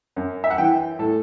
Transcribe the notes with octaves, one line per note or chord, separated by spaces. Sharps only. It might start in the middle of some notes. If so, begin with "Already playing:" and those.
F#2
E5
F#5
E3 G5
A2 A4